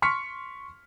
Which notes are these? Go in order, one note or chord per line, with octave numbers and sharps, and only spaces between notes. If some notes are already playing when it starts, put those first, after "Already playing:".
C6 C#6 F6 B6 C#7